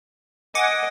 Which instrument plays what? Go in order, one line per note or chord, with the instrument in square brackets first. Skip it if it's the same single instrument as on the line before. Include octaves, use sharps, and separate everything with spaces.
[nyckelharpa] D#5 [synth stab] F#5 G#5 D6